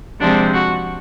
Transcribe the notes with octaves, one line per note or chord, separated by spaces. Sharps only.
C3 F3 G#3 C4 D4
F#4